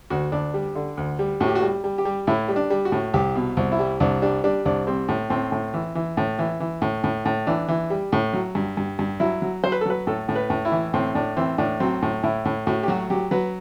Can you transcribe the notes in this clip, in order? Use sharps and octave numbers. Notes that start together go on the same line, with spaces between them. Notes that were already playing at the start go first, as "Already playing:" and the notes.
D2 F#4
D2 D4
G3
D3
D2
G3
A2 F#4
G4
F#4
G3
G3
G4
G3
A2 E4
G3
D4
G3
F#4
A2
C2 G4
B2
C2
E4
G3
C2 D4
G3 D4
G3 D4
C2 D4
G3 C4
A2
A2 C4
A2
E3
E3
A2
E3
E3
A2
A2
A2
E3 D4
E3
G3
A2
F#3
G2
G2
G2
F#3 E4
F#3
F#3 C5
B4
A4
F#3 B4
A2 A4
A2
B4
A2
E4
E3
A2 C4
A2 D4
E3 C4
A2 D4
F#3 C4
A2
A2 E4
A2
A2 F#4
G4
F#3 F#4
F#3 G4
F#3 B4